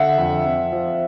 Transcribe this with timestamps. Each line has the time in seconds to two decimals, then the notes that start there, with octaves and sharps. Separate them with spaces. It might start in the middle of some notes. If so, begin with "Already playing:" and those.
Already playing: D3 E5 F#5
0.18 F2
0.45 F2
0.72 F3